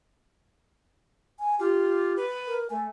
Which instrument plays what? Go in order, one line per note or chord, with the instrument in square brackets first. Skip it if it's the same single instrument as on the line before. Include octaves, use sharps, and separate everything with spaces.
[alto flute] G#5
[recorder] F4 [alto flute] G4
[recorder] B4
[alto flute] A#4
[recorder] A3 [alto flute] G#5